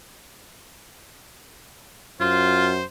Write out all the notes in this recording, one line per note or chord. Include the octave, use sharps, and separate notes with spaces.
F#2 F4 C5